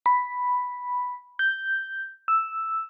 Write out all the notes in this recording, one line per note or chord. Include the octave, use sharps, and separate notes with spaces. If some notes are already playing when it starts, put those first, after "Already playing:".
B5
G6
E6